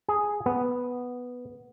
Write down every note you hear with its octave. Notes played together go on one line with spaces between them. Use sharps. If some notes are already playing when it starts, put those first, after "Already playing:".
G#4
B3